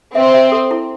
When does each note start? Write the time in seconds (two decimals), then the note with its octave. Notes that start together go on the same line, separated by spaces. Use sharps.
0.15 C4 E5
0.34 E5
0.52 A4
0.71 E4